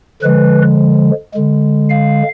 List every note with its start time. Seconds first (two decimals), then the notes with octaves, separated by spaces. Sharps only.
0.22 D3 F3 G#3 B4
1.33 D3 G#3
1.89 F5